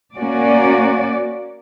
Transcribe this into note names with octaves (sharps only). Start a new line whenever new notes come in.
A#3 C#4 F#4 D5